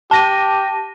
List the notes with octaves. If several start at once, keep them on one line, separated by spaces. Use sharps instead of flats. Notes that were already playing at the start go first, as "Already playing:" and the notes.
G4 A5 A#6 D#7